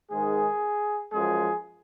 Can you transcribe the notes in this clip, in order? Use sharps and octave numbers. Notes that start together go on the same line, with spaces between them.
G#2 D#3 G#3 G#4
F#2 F3 G#3 G#4